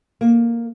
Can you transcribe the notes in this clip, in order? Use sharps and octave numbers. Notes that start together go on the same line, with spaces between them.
A#3